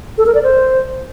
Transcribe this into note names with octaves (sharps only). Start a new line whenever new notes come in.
A4
A#4
D5
C5